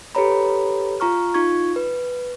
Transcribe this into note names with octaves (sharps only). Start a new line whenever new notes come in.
G4 A4 B4 C#5 A#5 B5
F4 A#5 C#6 F6
D#4 F4 C#6 G#6
B4